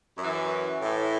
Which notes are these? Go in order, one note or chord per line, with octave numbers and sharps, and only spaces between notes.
F#2
E3
A2 E3